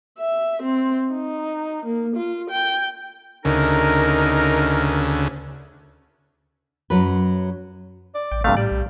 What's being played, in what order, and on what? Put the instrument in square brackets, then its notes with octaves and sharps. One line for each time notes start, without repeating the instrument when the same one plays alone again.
[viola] E5
C4
D#4
A#3
F4
G5
[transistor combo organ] D2 C#3 [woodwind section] D#4 A#4
[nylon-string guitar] F#2 F#3 B4
[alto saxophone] D5
[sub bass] A1 [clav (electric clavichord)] G5
[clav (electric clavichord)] G2 C3 A3 [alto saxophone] F5
[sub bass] A2 [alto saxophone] G3 [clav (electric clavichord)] D5
[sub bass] B1